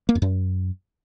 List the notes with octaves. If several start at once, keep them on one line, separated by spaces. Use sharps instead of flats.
A#3
F2
F#2